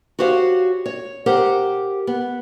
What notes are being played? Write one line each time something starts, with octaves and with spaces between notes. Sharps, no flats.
F#4 G4 C5 C#5 F5
C#5
G4 A#4 C5 F#5
B3